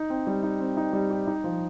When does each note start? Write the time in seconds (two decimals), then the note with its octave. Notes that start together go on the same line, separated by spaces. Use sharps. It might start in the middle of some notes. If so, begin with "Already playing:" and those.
Already playing: D#4
0.10 C4
0.27 G3
0.43 D#4
0.60 C4
0.77 D#4
0.93 G3
1.10 G4
1.27 D#4
1.44 F3